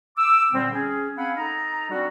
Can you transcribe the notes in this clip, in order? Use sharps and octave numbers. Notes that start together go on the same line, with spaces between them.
D6 E6
A#2 D3 G3 C4
C#4 G#4
C4 C#4 F5 F#5 G#5 B5
D#4 A4 D#5 A#5
G3 C4 D4 F#4